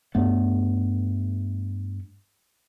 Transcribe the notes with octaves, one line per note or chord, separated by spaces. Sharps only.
G2 A3 B3